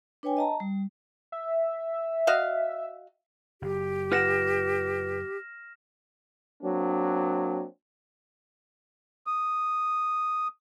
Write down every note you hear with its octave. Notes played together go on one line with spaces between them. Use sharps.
D4 B4 C#5 G5 G#5
D#5 A5 A#5
G3
E5
F#4 D#5 F5
F#1 G4
F4 B4 F#5 F6 A#6 E7
F#3 A#3 C4 D4
D#6